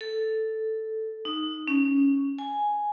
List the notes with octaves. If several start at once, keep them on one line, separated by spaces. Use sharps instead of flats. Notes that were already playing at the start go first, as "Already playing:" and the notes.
A4
D#4
C#4
G#5